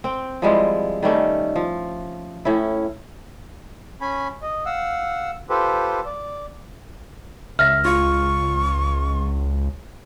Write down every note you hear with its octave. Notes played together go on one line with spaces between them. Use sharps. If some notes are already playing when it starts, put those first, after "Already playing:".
C4 G5
F3 G3 G#3 E4
D#3 G3 A3 C#4
F3
A2 C#4 E4
C#4 G#5 B5
D#5
F5 F#5 E6
F4 G4 A4 B4 C5
D5
C#2 E5 F6 A#6
F4 C#6